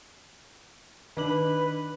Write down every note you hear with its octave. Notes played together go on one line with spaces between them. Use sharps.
D#3 D4 B4 F#7